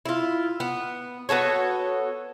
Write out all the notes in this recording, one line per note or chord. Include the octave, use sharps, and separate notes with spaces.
E4 F4
B3
B3 F#4 A4 C#5